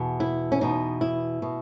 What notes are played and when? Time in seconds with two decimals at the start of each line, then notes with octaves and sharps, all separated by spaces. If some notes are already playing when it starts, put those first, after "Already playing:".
Already playing: E2 B2
0.20 E4
0.52 C#4
0.61 E2 B2 D#4
1.01 E4
1.42 B2